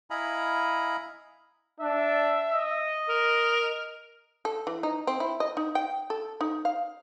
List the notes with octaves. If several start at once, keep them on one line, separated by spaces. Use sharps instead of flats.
E4 D#5 F5 G#5 A#5 B5
D4 E5
D#5
A#4
A4
E3
D#4
C4
E4
D#5
D#4
G5
A4
D#4
F5